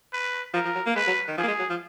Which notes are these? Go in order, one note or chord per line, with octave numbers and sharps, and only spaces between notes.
B4
F3 A#4
F3
F#3
A#3
G#3 B4
F#3
D#3
F3 G#4
A#3
G#3
F#3
F3